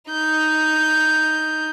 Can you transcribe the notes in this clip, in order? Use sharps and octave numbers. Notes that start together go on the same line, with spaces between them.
D#4 G6